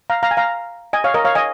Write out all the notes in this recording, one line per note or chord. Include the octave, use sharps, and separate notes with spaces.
F5 A#5
F5 A#5
G#5
F5 A#5
D#5 G#5
C#5 F5
A#4 D#5
C#5 F5
D#5 G#5